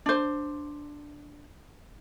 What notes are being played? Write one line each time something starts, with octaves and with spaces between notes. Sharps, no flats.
D4 C5